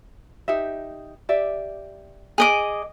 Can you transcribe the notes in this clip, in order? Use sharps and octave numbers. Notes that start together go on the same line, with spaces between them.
D#4 G4 E5
G4 D5 E5
G#4 D#5 D6